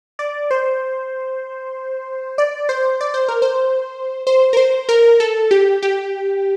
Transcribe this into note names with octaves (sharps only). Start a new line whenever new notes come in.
D5
C5
D5
C5
D5
C5
A#4
C5
C5
A#4
C5
A#4
A4
G4
G4